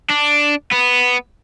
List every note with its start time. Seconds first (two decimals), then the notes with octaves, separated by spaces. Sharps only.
0.10 D4
0.71 B3